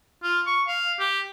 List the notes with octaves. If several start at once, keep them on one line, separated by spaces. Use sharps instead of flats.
F4
C#6
F5
G4